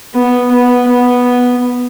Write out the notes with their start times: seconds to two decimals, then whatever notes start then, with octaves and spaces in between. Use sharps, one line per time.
0.14 B3
0.51 B3
0.89 B3